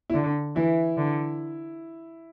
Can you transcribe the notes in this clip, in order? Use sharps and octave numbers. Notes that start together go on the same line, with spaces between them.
E4
D3 D4
E3 E4
D3